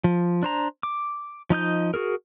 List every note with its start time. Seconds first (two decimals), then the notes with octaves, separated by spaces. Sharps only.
0.04 F3
0.43 D4 C5 A#5
0.83 D6
1.50 F3 D#4 D#5 G6
1.94 F#4 G#4 A#4